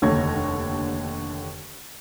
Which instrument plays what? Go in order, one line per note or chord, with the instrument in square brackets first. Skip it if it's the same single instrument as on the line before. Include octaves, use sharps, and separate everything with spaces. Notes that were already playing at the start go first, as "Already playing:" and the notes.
[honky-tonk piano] F1 D#2 D3 C#5 G#6 A#6